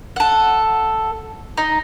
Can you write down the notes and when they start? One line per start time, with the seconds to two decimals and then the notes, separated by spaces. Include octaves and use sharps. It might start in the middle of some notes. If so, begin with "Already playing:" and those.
0.16 A4 F#5
1.57 D#4